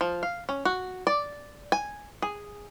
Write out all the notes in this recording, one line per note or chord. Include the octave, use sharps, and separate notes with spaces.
F3
F5
C#4
F#4
D5
G#5
G#4